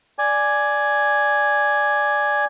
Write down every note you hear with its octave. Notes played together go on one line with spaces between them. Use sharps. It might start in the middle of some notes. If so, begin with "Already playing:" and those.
D5 G#5